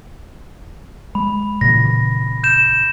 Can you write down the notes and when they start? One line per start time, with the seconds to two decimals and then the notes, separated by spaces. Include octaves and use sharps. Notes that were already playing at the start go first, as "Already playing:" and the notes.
1.15 G#3 B5
1.61 A#2 C#3 E3 A#6
2.44 G6 E7